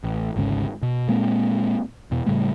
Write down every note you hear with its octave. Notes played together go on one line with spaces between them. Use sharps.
A1
G#1 D2 G#2 C#3
B2
A#2 G#3 A#3 C4
E2 B2
A2 C#3 G3 A3